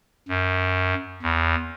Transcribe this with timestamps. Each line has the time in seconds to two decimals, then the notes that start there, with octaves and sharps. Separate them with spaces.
0.29 F#2
1.22 E2